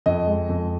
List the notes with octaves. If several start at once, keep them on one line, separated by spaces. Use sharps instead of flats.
F2 D#5
G#3
F2